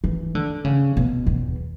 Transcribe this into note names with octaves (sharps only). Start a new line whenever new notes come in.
E3
D3
C#3
B2
E2